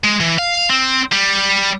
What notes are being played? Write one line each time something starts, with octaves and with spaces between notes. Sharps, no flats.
G#3
E3
F5
C4
G3